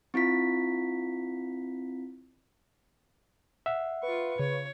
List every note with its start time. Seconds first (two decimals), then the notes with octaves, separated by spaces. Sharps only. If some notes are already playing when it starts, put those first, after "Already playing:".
0.14 C4 E4 F4 B6
3.66 E5 F#5
4.03 F4 B4 C#6
4.39 C#3 C#5